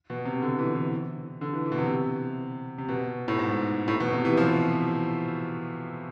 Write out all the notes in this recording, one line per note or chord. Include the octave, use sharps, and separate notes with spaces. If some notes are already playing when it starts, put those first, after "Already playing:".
B2
C3
D3
E3
E3
D3
E3
E3
B2
C3
C3
B2
A2
G#2
A2
B2
C3
E3
F3